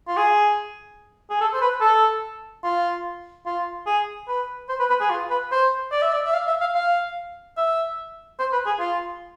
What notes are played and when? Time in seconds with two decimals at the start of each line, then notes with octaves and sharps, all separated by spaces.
0.08 F4
0.17 G#4
1.30 G#4
1.41 A4
1.54 C5
1.61 B4
1.81 A4
2.64 F4
3.46 F4
3.86 G#4
4.28 B4
4.69 C5
4.79 B4
4.90 B4
5.00 G#4
5.10 F4
5.30 B4
5.52 C5
5.92 D5
6.02 E5
6.13 D5
6.26 E5
6.34 F5
6.47 E5
6.61 F5
6.75 F5
7.57 E5
8.39 C5
8.53 B4
8.66 G#4
8.80 F4